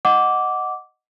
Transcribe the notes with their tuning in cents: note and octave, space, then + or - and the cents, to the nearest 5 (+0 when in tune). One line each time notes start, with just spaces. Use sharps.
D#5 +0 F#5 +0 D6 -10